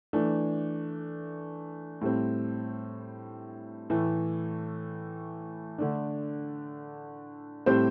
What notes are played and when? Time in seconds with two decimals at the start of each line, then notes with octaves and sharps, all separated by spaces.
0.13 E3 A3 D4
2.01 A2 G3 C4
3.90 A2 E3 A3
5.78 D3 A3 D4
7.66 A2 G3 C4 G4 C5